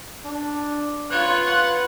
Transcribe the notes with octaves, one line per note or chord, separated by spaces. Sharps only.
D4
F4 B4 C#5 F#6
F#5